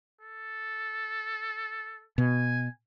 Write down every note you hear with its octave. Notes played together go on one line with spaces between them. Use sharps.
A4
B2 G#5